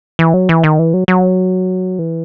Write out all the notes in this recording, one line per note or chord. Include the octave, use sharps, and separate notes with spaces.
E3
F#3
E3
D#3
E3
F#3
F#3
E3